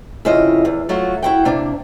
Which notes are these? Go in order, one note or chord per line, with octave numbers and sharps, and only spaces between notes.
F2 C#3 E4 F4 D#5
E2
F#3 A3 F4 F#4
E4 F#4 G5
C3 A#3 D4